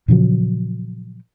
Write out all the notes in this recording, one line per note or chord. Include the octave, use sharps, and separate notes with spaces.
A#2 C#3 F3 F#3